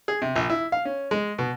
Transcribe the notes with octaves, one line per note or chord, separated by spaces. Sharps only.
G#4
C3
A#1
E4
F5
C#4
G#3
B2